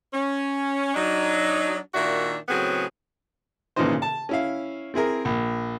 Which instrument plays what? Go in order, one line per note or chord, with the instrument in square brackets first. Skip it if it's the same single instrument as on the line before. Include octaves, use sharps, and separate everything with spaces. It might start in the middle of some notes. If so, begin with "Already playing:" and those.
[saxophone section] C#4
F#3 D4 D#4
A#2 D#3 D4 F#4 E5
A2 C#3 F#3 B3 C4 G#4
[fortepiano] G#1 A#2 C#3 E3 D#4 C5
A5
C#4 E4 F5
C4 E4 G#4 A#4
A#1